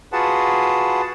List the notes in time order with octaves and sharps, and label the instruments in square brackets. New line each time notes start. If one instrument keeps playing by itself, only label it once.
[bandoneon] F4 F#4 G#4 B4 F#5 A5